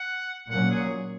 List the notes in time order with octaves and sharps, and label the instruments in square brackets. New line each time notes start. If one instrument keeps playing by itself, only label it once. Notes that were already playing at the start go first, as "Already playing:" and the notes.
Already playing: [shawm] F#5
[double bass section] A#2 F#3 C#4 [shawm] F#5
[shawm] G#4